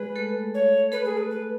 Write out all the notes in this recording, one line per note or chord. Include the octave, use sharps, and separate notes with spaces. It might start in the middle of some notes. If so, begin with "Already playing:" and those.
Already playing: G#3 G#4 B4
A3 A4
C#5
A3 A4 B4
G#4
B4
B4